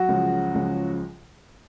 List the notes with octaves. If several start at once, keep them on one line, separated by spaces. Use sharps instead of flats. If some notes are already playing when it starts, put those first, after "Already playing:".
Already playing: F#3 F#4
C#2 C#3 F3
C#2 C#3 F3